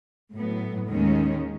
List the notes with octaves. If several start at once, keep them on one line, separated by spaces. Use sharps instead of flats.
A2 F#3 B3
D#2 D#3 G#3 C#4